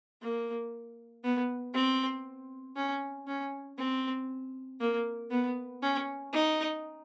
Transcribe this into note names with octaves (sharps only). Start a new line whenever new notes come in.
A#3
B3
C4
C#4
C#4
C4
A#3
B3
C#4
D#4